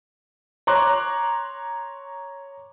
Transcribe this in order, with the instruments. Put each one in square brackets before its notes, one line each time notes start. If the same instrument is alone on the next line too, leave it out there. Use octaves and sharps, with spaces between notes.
[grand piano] C#5 A#5 C6 D6 F#6